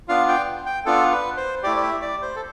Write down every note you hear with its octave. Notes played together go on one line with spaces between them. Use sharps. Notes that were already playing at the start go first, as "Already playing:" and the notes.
B3 D4 F4 F5
G5
G5
B3 D4 F4 A4
B4
C5
A3 E4 G4 D5
D5
E5
D5
C5
A4